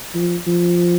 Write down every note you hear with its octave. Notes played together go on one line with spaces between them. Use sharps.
F3
F3